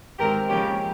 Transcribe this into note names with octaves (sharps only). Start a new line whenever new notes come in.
G#2 D#3 G#3 C4 G4 A#4
C#3 F3 A#3 C#4 G4